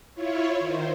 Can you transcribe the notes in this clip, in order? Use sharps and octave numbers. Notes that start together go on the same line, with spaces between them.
E4 F4 C#5
D#3 C5